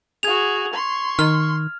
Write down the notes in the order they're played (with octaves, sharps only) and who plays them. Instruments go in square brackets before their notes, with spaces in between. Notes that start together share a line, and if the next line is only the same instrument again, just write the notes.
[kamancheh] F#4 G#4 [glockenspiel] G#6 F7
[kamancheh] C6 C#6
[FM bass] D#3 [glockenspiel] F6